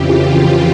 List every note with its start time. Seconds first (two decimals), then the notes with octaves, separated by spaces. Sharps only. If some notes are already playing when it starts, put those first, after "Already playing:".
Already playing: F2 C#3 E3 F4 G4
0.30 F4